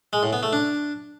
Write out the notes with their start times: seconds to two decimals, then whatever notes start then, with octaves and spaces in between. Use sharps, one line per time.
0.13 G#3
0.23 A2
0.33 B3
0.43 A3
0.53 D4